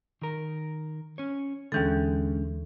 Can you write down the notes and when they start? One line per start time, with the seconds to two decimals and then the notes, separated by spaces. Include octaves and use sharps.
0.22 D#3 A#4
1.18 C#4 C#5
1.72 D#2 D3 E3 G#3 C#4 A4